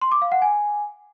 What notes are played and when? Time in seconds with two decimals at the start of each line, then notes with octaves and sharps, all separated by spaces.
0.01 C6
0.12 D6
0.22 F5
0.32 F#5
0.42 G#5